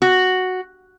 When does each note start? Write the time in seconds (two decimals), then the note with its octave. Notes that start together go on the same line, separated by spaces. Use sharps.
0.02 F#4